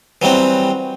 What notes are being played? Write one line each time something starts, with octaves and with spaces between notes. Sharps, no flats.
E3 F#3 G3 C4